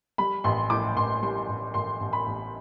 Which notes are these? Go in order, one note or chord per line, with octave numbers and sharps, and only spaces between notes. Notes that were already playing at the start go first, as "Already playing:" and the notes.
G3 B5
A1 C6
A2 D6
A1 C6
G3 C6
A1
A1 C6
A1
B5
A1